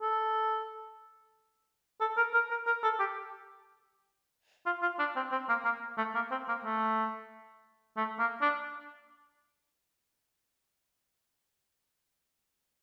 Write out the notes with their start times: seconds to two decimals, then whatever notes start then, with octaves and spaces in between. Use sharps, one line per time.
0.02 A4
2.01 A4
2.17 A#4
2.34 A#4
2.51 A#4
2.67 A#4
2.83 A4
3.00 G4
4.66 F4
4.82 F4
4.99 D4
5.16 C4
5.32 C4
5.49 A#3
5.65 A#3
5.98 A3
6.15 A#3
6.31 C4
6.49 A#3
6.65 A3
7.97 A3
8.19 A#3
8.42 D4